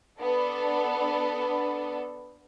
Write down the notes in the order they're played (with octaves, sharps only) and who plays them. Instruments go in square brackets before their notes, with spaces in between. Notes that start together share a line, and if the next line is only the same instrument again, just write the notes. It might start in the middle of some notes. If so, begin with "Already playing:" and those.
[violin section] B3 D4 A4